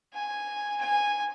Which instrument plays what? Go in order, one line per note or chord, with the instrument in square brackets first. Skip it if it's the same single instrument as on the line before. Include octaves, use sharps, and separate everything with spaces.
[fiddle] G#5
G#5